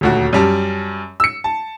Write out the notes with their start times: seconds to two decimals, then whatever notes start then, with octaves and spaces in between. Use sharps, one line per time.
0.01 D#1 D2 F#4
0.33 F#2 G3 A5
1.20 E6 C#7
1.44 A5